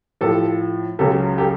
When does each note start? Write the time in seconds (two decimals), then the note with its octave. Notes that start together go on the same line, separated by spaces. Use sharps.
0.21 A2 F3 G4 A4
0.99 C#2 C#3 F#3 G4 A4
1.38 G4 A4